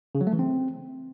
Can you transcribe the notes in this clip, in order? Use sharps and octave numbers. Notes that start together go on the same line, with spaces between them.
C#3
F#3
A3
E3
C4